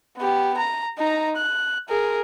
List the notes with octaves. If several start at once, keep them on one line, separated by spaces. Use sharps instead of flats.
B3 G4
A#5
D#4 A#5
F#6
G#4 A#4